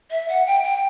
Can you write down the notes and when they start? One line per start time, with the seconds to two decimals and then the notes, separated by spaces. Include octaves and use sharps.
0.11 E5
0.29 F#5
0.46 G5
0.64 G5